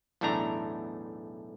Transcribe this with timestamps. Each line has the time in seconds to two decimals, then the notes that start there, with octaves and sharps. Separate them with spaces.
0.21 B1 E2 A2 A3 D4 A#5